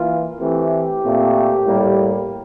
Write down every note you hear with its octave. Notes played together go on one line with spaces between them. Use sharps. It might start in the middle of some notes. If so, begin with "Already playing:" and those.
Already playing: E3 A#3 F4
E3 A3 C4 G4
A#2 A3 C4
A2 G3 A#3